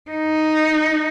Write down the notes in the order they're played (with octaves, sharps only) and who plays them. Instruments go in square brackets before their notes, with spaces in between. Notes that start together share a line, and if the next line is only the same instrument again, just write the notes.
[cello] D#4